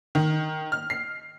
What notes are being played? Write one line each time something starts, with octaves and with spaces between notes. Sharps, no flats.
D#3
F6
C7